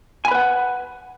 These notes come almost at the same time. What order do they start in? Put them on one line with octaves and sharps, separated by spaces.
G#5 B5 B4 F#5